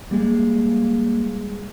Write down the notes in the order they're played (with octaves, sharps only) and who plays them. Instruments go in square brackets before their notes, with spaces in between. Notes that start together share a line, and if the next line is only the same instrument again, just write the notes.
[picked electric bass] G3 G#3 [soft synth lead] A#3